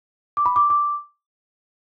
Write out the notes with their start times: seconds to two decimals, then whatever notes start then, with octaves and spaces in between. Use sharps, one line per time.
0.37 D6
0.46 B5
0.56 D6
0.70 D6